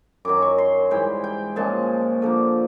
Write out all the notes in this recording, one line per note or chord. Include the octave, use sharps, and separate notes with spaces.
F#2 D#3 F#3 D6
C#6
C6
G#2 E3 G3 G5
G5
A#2 F3 G#3 C#4 A5
D3 F3 A#3